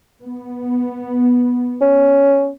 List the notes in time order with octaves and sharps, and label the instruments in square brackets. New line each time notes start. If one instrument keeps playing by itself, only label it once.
[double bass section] B3
[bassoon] C#4